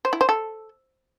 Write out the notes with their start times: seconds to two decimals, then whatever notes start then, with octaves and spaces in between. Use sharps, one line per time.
0.05 C5
0.13 E4
0.21 C5
0.29 A4